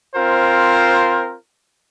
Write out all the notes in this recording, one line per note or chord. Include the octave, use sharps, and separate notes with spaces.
C4 F4 A#4 C5